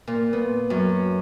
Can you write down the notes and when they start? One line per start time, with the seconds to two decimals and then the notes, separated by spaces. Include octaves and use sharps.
0.07 A#2
0.33 B3
0.70 F#2